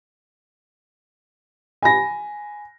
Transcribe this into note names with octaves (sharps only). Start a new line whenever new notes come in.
G#5 B5 A#6